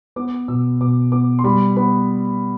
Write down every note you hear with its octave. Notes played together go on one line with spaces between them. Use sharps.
B3 D6
B2 E6
B2 D6
B3 D6
C6
G3 B5
B3 B5